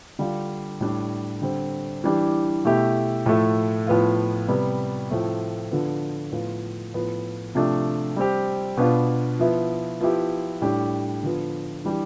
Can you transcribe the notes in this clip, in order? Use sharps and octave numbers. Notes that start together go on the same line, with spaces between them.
D3 G3 D4 F4
A2 G3 D4
D3 G3 C4
E3 G3 D4 G4
B2 A3 E4 G4
A2 F3 A3
A2 F3 B3 F4
C3 G3 B3
A2 F3 A3 C4
D3 F3 B3
A2 F3 B3 F4
A2 F3 B3
C3 F3 A3 D4
G3 C4 G4
B2 B3 D4 F4
F3 B3 E4
F3 B3 E4 G4
A2 G3 D4 G4
D3 F3 B3
E3 G3 D4 G4